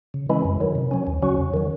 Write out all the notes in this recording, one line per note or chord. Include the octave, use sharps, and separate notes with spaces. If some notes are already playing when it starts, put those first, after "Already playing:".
C#3
E3 G#3 C#4 E4
F#2
D#3 F#3
C3
F#3 C#4
D#2
C#3 F#3 C#4 F#4
E2
D#3 F#3